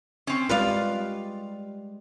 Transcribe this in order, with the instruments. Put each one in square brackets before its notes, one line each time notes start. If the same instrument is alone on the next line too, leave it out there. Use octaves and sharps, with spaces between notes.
[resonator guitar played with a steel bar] C4 C#4
[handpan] G3 G#3 [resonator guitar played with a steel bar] F4 [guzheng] B4 D5 F5